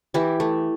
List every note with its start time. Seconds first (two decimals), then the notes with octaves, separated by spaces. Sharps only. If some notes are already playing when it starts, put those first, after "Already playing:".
0.14 E3 E4 G4
0.40 A3